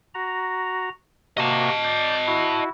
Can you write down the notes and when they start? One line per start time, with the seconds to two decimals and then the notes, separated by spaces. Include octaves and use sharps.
0.15 F#4 A#5
1.37 C3 A#3 F#4 D#5 A5
1.84 D5 G6
2.27 E4 F#4